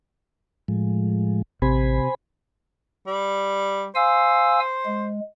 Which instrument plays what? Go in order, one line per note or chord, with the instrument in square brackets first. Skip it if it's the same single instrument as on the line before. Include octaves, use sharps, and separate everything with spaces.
[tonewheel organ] A2 F3 G#3
[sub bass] A1 [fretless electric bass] C3 [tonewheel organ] C5 G#5 B5
[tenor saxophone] G3
[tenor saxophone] C5 [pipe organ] F5 G#5 E6
[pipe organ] G#3